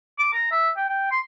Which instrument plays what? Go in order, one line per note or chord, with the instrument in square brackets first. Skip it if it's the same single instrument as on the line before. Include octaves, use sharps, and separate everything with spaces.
[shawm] D6
A#5
E5
G5
G5
C6